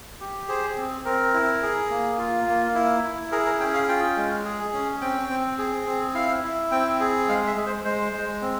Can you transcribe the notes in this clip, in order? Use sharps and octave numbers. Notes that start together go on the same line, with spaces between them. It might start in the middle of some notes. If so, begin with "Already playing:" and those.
G4
G#4 C5
C4
C4 A#4
E4
G#4
A#3
F4
A#3
E4
E4
G#4 A#4
A#4
C#4 G5
F5
F4 G5
G#3
G#4
C#4
C4 G5
C4
G#4
C4
E4 F5
E4
C4 G5
G#4
G#3 F5
E5
G#3
C5
G#3 C5
G#3
C4